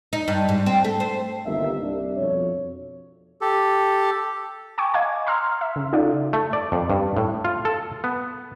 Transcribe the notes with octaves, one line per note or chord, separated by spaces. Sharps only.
D#4
G2
G#2
C4
A3
C5
G1 C2 D#3 A#3 E5
C2 D4
F2 B2 F3 C#5
G4 A4
G5 G#5 C#6 D6
D#5 F5 G#5 G#6
A#5 C6 E6 F6
E5
C#3
D#4 F4 F#4 A4 D5 F5
A3
D5
F2
G2
A2
F4
A4
B3